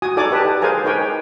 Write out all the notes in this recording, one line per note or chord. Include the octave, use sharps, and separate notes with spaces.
F#4 G#5 D#6
D#4 A4 C#5 D5 G#5 D6
G4 B4 A5
G#4 A#4 C5 F5 G#5 A#5
D#4 B4 C#5 G5 G#5